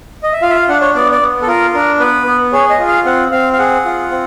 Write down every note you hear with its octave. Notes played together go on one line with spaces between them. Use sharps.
D#5
E5
F4 F5
E5
F5
D4 F#5
C#5
B3 D5
D5
B3
A4
F4 A#4
D4 A#4
B3 B4
B3
G#4 C#5
D#5
F4
F5
C4 F#5
C4 F5
F5
G#4 F#5
F4
C4